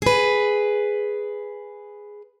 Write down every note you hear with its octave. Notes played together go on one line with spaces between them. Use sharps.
G#4 B4